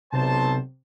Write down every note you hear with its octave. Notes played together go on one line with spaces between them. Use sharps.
B1 C3 C5 A5